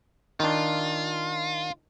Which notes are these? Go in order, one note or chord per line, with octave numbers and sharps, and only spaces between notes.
D#3 D4 F4